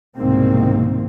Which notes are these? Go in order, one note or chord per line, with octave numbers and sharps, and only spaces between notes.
C2 G#2 B2 D#3 A#3 C4